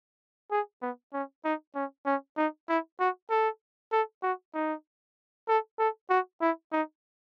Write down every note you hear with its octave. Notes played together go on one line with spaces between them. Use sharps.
G#4
B3
C#4
D#4
C#4
C#4
D#4
E4
F#4
A4
A4
F#4
D#4
A4
A4
F#4
E4
D#4